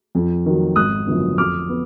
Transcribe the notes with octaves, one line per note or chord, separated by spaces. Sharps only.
F2
D#3 F#3
G#1 D#6 F#6
F#2 D3 F3 B3
F2 D6 F6
B3